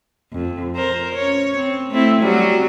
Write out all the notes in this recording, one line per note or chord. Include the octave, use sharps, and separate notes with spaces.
F2
A#4 C5
C#4 C#5
C4
A3 C4 E4
F#3 G3 F#4